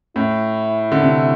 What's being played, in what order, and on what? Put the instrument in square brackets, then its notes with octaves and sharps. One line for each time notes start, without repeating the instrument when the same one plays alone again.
[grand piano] A2 [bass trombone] E4
[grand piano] D3
C3